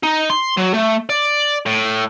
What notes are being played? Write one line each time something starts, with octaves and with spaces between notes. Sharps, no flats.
D#4
C6
F#3
A3
D5
A2